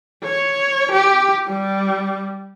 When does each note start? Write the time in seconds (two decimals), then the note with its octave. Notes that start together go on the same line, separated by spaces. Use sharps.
0.24 C#5
0.92 G4
1.47 G3